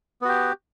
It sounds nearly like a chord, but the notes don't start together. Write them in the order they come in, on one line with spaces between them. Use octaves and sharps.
B3 F#4 G4